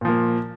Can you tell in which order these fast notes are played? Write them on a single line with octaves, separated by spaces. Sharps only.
A#2 F3 A#3